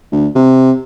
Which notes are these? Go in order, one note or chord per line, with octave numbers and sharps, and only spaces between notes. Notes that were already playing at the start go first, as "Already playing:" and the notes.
D2
C3